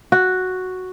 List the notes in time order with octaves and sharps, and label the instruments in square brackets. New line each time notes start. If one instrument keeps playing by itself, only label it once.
[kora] F#4